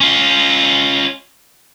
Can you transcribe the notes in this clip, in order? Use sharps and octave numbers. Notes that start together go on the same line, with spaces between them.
C#4 F4